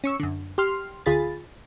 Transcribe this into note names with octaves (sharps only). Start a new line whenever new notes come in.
C#4 C#6 E6
F#2 D3
G4 C6 F6
D2 F4 G#4 B5 A6